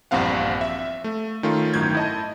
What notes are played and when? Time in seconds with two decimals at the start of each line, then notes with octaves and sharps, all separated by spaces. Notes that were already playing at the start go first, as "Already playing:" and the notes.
0.11 A#1 E2 G2 C4 F5 F#5
0.61 E5
1.04 A3
1.43 D#3 A3 C#4 F4
1.74 G1 A2 D#3 F#3 G6 G#6
1.95 E4 D#5 A5